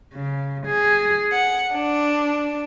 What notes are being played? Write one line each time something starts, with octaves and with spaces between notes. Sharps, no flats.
C#3
G#4
F#5
D4